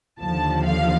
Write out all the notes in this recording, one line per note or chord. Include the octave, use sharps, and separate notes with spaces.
D#2 D3 F3 A5
F5